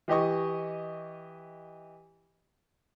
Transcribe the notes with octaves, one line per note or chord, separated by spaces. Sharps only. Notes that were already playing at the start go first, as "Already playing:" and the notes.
E3 G4 D#5 C#6